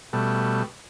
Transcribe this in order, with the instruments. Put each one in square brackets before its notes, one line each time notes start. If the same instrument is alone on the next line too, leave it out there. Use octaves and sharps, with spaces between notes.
[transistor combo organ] B2 G3 A3